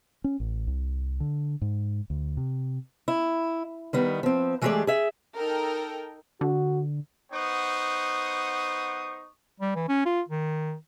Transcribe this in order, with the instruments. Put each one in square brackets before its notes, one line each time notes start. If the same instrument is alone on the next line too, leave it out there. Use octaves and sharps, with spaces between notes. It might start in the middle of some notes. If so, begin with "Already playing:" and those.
[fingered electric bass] C#4
A1
C2
D3
G#2
D2
C3
[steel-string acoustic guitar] E4
D#3 G3 B3
F3 C4
E3 G#3 A3 G4 G#4 D5
G#4 E5
[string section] D#4 A4 A#4 G5
[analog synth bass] D3 [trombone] F#4
[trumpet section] B3 D#4 C5 F#5 C#6 D#6
[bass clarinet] G3
E3
C#4
F4
D#3